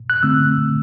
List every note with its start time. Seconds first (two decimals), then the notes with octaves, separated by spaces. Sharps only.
0.10 F#6
0.23 D3 A3 C4 E6